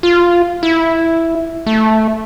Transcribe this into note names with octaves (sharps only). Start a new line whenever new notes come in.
F4
E4
A3